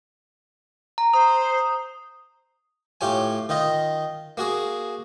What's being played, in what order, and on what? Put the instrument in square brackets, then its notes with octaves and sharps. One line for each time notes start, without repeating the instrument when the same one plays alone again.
[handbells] A#5
[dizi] C5 [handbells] A#5 [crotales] D#6
[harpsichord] A2 F4 G4 C#5 G#5
D#3 D#4 F4 D#5
A#3 F#4 G#4